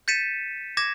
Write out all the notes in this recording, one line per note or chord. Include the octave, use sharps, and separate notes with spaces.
G6 A6 B6 C#7 D#7 E7
D6 G#6 A#6 E7